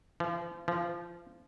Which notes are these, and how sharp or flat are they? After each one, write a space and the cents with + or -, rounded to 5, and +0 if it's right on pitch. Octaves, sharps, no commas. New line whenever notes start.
F3 -35
F3 -20